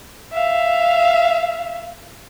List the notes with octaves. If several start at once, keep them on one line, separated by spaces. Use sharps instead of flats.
E5 F5